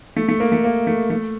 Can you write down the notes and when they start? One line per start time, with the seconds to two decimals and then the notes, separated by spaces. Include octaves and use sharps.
0.17 A3
0.29 A3
0.40 A#3
0.52 A3
0.64 A#3
0.87 A3
1.10 A3